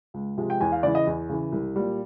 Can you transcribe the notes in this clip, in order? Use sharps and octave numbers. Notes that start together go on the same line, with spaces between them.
C#2
C3 F3 G#3
G5
E2 G#5
F5
C#3 E3 D5
D#5
E2
C#3 E3
C2
A#2 G3